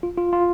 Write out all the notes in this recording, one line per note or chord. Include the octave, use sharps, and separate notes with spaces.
F4
F4
F4